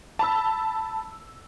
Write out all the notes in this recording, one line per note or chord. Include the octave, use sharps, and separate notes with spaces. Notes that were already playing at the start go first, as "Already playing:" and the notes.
A5 B5 E6